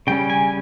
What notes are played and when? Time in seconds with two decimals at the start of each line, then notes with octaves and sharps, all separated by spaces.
0.07 C#3 G3 C#4 G5
0.30 G#5